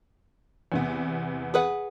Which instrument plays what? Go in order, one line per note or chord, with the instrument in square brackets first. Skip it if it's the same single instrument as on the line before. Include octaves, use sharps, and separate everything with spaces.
[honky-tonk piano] E2 C3 B3
[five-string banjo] G#4 B4 F#5